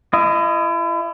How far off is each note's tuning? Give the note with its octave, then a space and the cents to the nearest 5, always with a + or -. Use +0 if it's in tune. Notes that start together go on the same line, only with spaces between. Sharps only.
E4 +35 D#5 +0